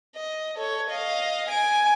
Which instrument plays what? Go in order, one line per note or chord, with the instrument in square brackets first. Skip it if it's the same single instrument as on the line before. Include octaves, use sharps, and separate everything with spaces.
[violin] D#5
A4 C#5
D#5 F5
G#5 D7